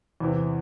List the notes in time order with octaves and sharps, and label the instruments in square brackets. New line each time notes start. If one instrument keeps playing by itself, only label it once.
[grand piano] E2 C3 E3